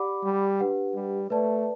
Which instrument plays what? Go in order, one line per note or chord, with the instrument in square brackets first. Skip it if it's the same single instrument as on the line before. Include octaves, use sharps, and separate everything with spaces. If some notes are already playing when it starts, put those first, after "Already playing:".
Already playing: [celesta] G4 D5 F#5 B5 D6
[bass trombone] G3
[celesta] D4 G4 B4 F#5
[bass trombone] G3
[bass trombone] A3 [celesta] B4 D5 A5